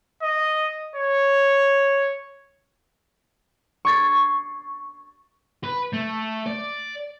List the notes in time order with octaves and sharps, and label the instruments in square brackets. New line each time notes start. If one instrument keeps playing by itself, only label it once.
[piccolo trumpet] D#5
C#5
[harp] C#6 D6 G#6 A6 C7
[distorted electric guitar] B4
A3
D5